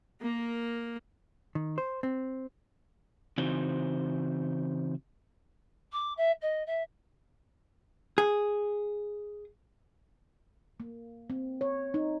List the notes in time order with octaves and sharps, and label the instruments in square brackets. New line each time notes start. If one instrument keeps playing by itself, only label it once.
[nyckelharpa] A#3 A#4
[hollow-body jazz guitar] D#3
C5
C4
[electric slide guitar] C#3 E3 C4 D#4 F#4 C5
[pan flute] D6
E5
D#5
E5
[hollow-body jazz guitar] G#4
[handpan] A#3
C4
C#5
D#4